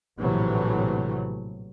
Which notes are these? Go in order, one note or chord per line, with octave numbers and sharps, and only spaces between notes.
A#1 A2 C3 E3 F#3 A3